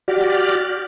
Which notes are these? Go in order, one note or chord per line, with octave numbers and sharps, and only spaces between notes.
F#4 G4 D5 F6